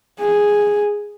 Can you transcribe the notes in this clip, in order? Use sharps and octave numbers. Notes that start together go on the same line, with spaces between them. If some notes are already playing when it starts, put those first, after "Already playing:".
G#4